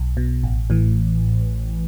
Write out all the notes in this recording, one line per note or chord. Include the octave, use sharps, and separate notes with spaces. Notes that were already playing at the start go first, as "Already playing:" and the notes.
Already playing: B1
B2
A1
A2 E3